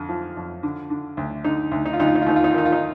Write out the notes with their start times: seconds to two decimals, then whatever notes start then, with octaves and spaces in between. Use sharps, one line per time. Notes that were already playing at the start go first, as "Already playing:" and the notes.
Already playing: F2 D3
0.09 F3
0.37 F2
0.63 D3
0.90 D3
1.17 D2
1.44 D3 D#4
1.71 D2
1.86 D#4
1.93 F4
1.99 D2 D#4
2.07 F4
2.15 D#4
2.22 F4
2.26 D#2 D#4
2.36 F4
2.44 D#4
2.50 F4
2.54 D#3 D#4
2.65 F4
2.72 D#4